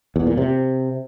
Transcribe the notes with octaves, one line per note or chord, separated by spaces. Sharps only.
E2
A#2
C3